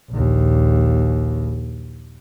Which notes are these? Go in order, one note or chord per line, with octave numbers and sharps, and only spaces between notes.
A#1 D#2